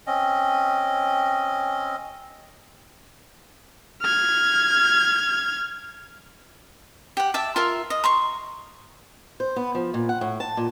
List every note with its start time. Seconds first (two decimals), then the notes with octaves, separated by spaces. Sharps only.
0.07 C4 C#4 D#5
4.02 F6 G#6
7.17 G4 F#5
7.34 E5 A5 D6
7.56 F4 A#4 E5
7.90 D#5
8.04 A#5 C6 C#6
9.40 C5
9.56 B3
9.75 F3
9.94 A#2
10.09 F#5
10.21 A2
10.40 A5
10.57 A#2